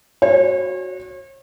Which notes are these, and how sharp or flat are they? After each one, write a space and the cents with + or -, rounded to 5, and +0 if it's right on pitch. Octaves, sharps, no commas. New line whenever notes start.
F#4 -5 C#5 -40